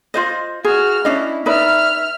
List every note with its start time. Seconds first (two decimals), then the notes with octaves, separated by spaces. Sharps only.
0.14 F4 C5 D#5
0.64 F#4 G#4 F6
1.05 C#4 D4 E4 D#5
1.46 D#4 B4 D5 E5 F6